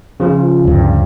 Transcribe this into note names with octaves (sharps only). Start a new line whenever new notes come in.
C#3 F3 F4
D2 G2